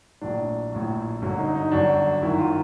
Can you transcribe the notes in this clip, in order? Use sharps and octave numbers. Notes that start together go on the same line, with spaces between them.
A#1 A2 F#3 D4
A#1 A2 F#3
G1 F#2 D3 F#3
D#4
D#4
G1 F#2 D3 F#3 D4
G1 F#2 D#3 F#3 E4
F4